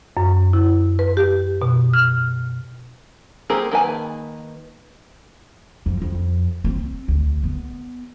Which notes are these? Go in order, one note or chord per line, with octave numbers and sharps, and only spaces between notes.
F#2
E4
B4
G4
B2
F6
A#3 C4 G4 G#4 A#4
D#3 A#3 B4 G#5 A5
F2
F2
C4
D2
B3